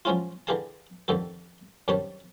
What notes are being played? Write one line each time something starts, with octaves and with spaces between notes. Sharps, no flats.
F3 F#3 G#3 C#4 E4 F4
D3 E3 G4 G#4 F5 A5
F2 D3 D#3 G4 A4
F#2 C3 D#3 G3 C#5 A5